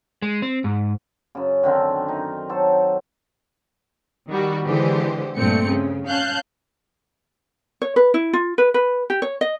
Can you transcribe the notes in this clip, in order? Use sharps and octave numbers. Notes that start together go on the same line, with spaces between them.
G#3
C4
G#2
F#2 C#3
D3 D#3 C4
D#4
F#3 A4 C5
D#3 G3 F#4
D3 E3 G#3 G4 C5
G2 A#2 A3 C4 C#7
C#3
C#4 F5 A5 F#6 G6
C#5
B4
E4
F4
B4
B4
G4
C#5
D#5